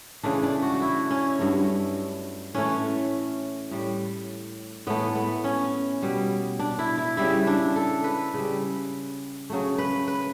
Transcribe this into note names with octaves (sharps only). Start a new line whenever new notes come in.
C#3 E3 A3 D4
D4
F#4
F#4
E4
C#4
G2 F#3 A3
A2 E3 A3 C#4
A2 G3
A2 E3 A3 B3
B3
C#4
B2 G3
D4
E4
E4
C#3 G3 E4
D4
A4
B4
C#3 G3
C#3 F#3 A3
B4
B4